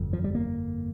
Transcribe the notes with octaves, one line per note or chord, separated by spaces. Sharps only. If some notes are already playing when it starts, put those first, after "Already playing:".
Already playing: G1 F2
F3
G3
A#3